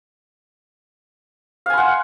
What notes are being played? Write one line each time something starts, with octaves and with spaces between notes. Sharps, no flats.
F5 F#5 G#5 C6